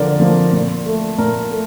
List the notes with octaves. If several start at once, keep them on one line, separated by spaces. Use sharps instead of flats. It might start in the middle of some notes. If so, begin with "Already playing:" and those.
Already playing: D3 F3 A#3 A#4 D5
F3 A#3
A#2
A3
A#2 A#4
A3